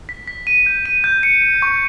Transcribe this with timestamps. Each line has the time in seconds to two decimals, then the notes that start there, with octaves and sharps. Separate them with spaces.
0.09 B6
0.28 B6
0.47 D#7
0.66 G6
0.86 D#7
1.04 G6
1.23 C#7
1.42 C#7
1.62 C#6